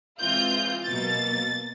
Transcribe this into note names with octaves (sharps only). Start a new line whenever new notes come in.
E3 G#3 C4 F4 G6
B2 F#3 A#3 A6